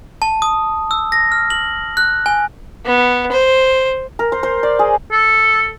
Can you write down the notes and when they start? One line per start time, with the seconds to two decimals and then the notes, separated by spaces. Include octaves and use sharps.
0.22 A5
0.42 D#6
0.91 E6
1.12 A#6
1.32 F6
1.50 F#7
1.97 F#6
2.26 G#5
2.86 B3
3.32 C5
4.19 A#4
4.32 C5
4.43 C5
4.63 D5
4.79 G#4
5.11 A4